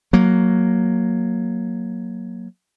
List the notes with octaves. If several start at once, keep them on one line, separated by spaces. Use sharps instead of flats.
F#3 A#3